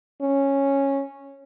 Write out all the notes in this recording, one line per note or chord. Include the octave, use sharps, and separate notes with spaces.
C#4